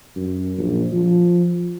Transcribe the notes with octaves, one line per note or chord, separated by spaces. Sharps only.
F#2
A#1
F3